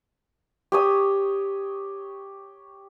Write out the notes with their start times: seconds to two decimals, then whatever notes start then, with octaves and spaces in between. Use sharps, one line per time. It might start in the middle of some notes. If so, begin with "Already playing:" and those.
0.72 G4 C#5 D#6